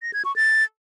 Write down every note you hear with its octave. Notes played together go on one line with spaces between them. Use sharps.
A#6
G#6
C#6
A6